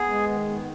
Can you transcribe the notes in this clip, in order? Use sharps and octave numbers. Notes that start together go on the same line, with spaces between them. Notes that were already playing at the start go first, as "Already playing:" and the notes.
Already playing: B3 G#4
G#3
D#3
B3